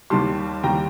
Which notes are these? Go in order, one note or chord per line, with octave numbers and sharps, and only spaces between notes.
D#2 D#3 G3 A5 C6
D#2 D#3 G3 G5 A#5